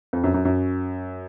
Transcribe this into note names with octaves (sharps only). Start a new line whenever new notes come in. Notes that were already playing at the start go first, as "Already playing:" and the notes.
F2
F#2
F#2
F#2